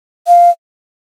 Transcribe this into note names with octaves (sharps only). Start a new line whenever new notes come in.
F5